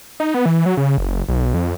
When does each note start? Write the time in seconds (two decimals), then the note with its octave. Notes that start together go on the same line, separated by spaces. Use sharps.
0.20 D#4
0.34 B3
0.46 E3
0.66 F#3
0.77 C#3
0.98 F#1
1.28 B1
1.54 F2